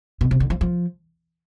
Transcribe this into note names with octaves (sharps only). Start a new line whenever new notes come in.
B2
C3
D3
F3
F3